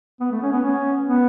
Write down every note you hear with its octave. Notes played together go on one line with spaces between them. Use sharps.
B3
A3
C#4
B3
C#4
B3